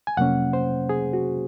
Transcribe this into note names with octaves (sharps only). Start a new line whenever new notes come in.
G#5
F2 C3 F#3 A#3 C#4 F#5
C5
G#4
F#4